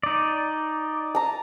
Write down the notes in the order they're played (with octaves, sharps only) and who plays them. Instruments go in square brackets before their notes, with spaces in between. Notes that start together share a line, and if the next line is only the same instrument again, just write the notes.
[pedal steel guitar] D#4 D5
[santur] A5 A#5